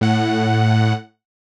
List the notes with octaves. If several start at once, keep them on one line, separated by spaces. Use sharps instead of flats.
A2 F#5